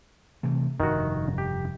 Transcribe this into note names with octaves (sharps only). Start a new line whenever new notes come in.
C3 E3 A3
F1 G2 D#3 F#4
G4